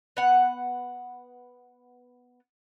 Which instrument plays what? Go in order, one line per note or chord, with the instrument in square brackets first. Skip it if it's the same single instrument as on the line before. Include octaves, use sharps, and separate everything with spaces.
[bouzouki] B3 F#5